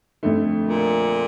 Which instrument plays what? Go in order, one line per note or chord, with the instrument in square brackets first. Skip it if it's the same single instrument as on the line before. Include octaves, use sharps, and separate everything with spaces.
[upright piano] F2 D3 A3
[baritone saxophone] A#2